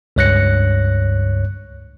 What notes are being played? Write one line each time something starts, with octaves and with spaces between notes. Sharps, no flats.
C#2 G2 C#5 F#6 A#6 C#7